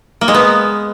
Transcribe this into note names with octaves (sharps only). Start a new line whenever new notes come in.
A#3
G#3
B3